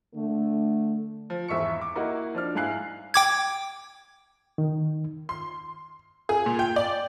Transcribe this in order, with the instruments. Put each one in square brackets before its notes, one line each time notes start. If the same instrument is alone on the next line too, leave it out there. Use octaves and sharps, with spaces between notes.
[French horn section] D3 A3
[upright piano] F3
G#1 E2 E5 C#6 C#7
D6
A#3 D#4 E4 F#4
F3 D4 F6
G#2 E4 F5 G#5 F#6 C7
[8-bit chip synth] G5 D6 G#6
[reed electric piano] D#3
[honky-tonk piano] C6
G#4
A#2
G5
D5